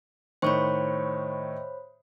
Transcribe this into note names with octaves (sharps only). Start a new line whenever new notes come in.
A2 D#3 C5 C#5 B5 C#6